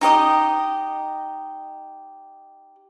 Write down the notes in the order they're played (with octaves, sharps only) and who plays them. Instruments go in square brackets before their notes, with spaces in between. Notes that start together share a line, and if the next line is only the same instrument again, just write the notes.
[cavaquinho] D#4 G4 D#5 D#6